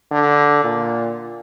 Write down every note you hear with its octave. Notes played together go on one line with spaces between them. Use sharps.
D3
A#2